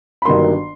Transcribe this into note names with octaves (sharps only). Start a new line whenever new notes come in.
B5
G1 G2 D#3 F#3 A#3 C6